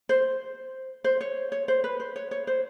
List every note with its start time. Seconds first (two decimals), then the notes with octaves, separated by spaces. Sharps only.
0.09 C5
1.04 C5
1.21 C#5
1.52 C#5
1.68 C5
1.84 B4
2.00 C5
2.16 C#5
2.31 C#5
2.47 C5